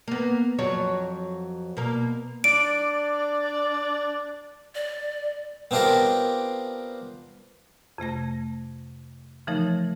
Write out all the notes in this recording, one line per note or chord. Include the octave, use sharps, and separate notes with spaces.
A#3 B3
F2 F#3 C#5
B2 A#3
D4 D5 D7
D5
B3 C4 D4 F4 G4 A#4
F2 C3 A3 A#6
C#3 E3 F3 A3 D#4 A#4